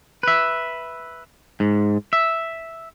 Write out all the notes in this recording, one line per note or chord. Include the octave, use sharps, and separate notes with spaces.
B4 E5
G#2
E5